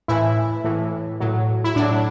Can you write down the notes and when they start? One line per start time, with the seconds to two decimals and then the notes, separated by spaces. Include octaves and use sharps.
0.08 A2 E3 E4
0.64 A2 E3
1.20 A2 F#3
1.64 E4
1.76 A2 F#3 D4